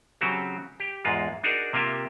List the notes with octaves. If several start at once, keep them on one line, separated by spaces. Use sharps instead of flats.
C#3 F#3 C4 F#4 G4
G4
E2 G#2 G#3 F4
D4 D#4 F#4 G#4 A#4
C3 A#3 F4 G4 E5